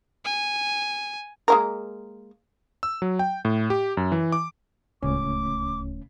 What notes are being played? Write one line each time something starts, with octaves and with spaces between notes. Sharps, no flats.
G#5
G#3 A#3 A#4
E6
F#3
G5
A2
G4
F#2
E3
D6
D1 C#2 A3 C#4 D6